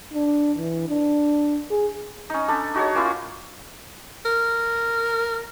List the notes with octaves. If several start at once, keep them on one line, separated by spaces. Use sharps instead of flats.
D4
E3
D4
G#4
C#4 D#4
D4 A4 B5
D#4 F#4 G#4 C#5
A#3 C#4 E4 F4
A#4